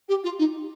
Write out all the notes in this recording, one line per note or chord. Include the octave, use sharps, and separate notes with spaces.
G4
F4
D#4